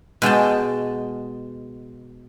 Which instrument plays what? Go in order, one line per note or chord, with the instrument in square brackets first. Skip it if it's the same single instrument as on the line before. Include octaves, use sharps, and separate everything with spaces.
[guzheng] B2 G#3 G5 A5